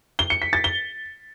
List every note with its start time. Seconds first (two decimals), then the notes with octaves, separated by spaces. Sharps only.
0.19 G7
0.30 C#7
0.42 B6
0.53 A6
0.64 G7